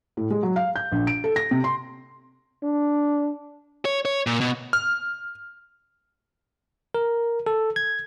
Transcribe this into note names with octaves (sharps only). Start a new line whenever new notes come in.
A2
G#3
F#3
F5
G6
A#1
D7
A4
A#6
C3
C6
D4
C#5
C#5
A#2
B2
F6
A#4
A4
G#6